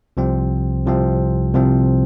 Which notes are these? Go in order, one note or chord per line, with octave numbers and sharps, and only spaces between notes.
C2 C3 F3 C4
C2 C3 F3 C4
C2 C3 F3 C4